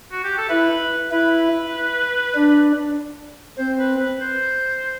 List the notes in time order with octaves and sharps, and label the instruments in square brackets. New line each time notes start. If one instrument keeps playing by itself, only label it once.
[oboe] F#4
G4
A4
[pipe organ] E4 [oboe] B4
[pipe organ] E4 [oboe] B4
[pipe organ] D4
[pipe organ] C4 [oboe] C5
[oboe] B4
B4
C5